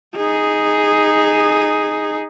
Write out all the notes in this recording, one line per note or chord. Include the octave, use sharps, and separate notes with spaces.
D#4 G#4